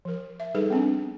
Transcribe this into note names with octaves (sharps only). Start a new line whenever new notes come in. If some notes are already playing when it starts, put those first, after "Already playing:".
F3 A#4
E5
G3 D#4 G#4 A4 B4
B3 C4 D4